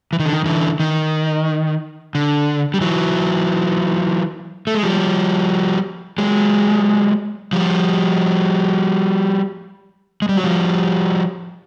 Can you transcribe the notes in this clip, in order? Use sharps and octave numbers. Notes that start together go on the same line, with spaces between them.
E3
D#3
D3
D#3
D3 E3
D#3
D3
G3
E3 F#3
A3
G#3
F3 G3
F#3 G#3
F3 G3
G#3
G3
F#3
F3 G3